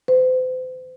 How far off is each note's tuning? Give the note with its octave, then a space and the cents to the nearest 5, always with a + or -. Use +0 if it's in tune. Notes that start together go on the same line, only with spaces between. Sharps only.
C5 -40